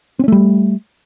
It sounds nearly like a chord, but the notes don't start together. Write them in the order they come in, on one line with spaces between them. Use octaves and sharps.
C4 C#4 A3 G3